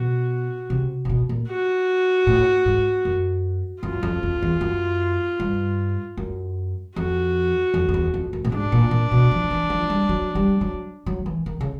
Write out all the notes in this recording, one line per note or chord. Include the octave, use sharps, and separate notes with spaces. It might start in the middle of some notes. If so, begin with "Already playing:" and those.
Already playing: B2 F#4
C3
C3
B2
A#2
F#4
A2
G#2
F#2
F#2 F4
F2
F2
E2
F#2
G2
F#2
F2 F#4
F2
F2
E2
F2
F#2
A2
G#2 D4
A#2
A#2
B2
F3
E3
F3
G3
F#3
G3
F#3
F#3
E3
D#3
C#3